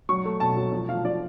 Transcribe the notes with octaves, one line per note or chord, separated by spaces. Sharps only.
F#3 C#6
A3
B2 A5
F#3
F3
F3 F5
F3 D5